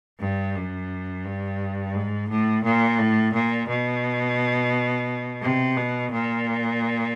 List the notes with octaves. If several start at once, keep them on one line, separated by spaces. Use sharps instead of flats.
G2
F#2
G2
G#2
A2
A#2
A2
A#2
B2
C3
B2
A#2